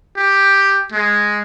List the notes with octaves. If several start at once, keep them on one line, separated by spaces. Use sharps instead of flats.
G4
G#3